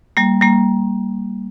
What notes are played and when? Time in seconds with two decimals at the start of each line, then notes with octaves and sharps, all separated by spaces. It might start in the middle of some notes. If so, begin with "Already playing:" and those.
0.17 G3 A#3
0.41 G3 A#3